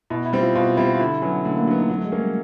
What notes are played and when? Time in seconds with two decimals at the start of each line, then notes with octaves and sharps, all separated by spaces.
0.10 B2 E4
0.26 E4
0.33 G3 C4
0.41 F4
0.55 B2 F4
0.77 G3 C4 E4
0.94 F4
0.99 D3 E4
1.22 F#3 B3 C#4
1.45 D3 A3
1.56 A#3
1.67 F#3 B3 D4
1.78 D#4
1.90 F#3
1.98 A3
2.05 G#3
2.12 A#3 C#4
2.19 G3